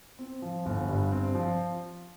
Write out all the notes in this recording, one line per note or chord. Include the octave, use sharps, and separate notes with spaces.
C4
F3
G1
G2
C4
F3